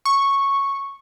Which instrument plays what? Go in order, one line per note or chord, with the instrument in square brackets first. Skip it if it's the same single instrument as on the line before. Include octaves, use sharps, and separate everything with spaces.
[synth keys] C#6